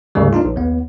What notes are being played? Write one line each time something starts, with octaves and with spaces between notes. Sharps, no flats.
D2 G#2 C#3 G3
A#3 D4 D#4 F4
A#1
D#2 B3